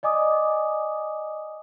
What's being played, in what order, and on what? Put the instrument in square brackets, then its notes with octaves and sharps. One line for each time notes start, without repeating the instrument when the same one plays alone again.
[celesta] D5 D#5 G#5 D6 D#6